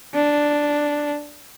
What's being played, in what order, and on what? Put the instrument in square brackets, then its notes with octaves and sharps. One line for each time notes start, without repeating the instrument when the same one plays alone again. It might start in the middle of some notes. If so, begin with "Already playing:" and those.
[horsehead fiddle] D4